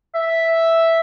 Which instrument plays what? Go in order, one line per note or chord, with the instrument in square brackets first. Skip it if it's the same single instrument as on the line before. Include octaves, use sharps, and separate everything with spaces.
[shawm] E5